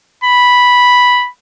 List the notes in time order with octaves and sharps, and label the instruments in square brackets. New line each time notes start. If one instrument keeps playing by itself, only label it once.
[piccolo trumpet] B5